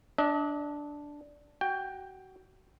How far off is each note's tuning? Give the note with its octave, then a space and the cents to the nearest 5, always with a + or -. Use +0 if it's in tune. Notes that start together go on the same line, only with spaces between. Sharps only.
D4 -5 D#5 +40
F#4 +30 G5 +10